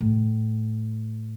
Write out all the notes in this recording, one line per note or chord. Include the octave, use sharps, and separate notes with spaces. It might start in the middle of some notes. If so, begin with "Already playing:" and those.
A2